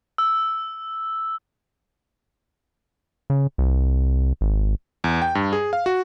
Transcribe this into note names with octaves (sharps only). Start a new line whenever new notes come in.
E6
C#3
C2
G#1
E2
G5
G2
G#4
F5
F#4